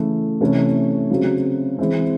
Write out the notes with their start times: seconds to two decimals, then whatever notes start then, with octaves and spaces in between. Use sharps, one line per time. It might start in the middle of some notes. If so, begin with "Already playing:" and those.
Already playing: C#3 E3 A3
0.41 C3 E3 A3 C#4
1.10 C#3 F#3 C4
1.79 E3 G#3 C4